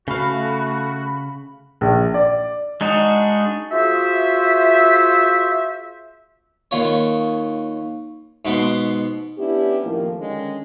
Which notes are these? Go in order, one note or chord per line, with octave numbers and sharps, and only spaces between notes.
C#3 A3 F#4 F5 B5
A#1
D5
G#3 D4 D#4 F#4
F4 F#4 G#4 C5 E5
D#2 F4 C#5
G#2 B2 B3 B5 C6
B3 C#4 D4 E4 G4
F2 A2 D#3 F3 A3 A#3
D3 D#3 G#3 C#4